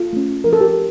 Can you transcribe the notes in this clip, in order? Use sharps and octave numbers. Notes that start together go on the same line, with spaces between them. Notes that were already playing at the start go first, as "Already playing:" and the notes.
Already playing: F4 A4
A3 C#4
F3 A#4
A4
G4 A#4